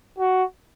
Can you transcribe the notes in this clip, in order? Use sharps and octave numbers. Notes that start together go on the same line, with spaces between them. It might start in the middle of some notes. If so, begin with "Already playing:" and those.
F#4